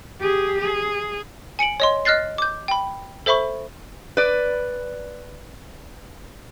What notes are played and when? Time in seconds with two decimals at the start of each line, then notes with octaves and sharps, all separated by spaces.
0.20 G4 G#4
0.60 G#4
1.59 G#5 C#7 D7 F#7
1.80 C#5 D#5 C6
2.05 D#5 F6 F#6 A6 C7
2.38 D6 G6
2.68 G5 B5
3.26 A4 C5 E5 B5 C#6
4.17 B4 D5